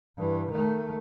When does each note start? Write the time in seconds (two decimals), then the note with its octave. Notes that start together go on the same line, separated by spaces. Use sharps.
0.18 G2 E3
0.51 D#3 A3